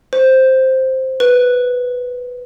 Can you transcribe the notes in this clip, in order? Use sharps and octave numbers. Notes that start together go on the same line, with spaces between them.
C5
B4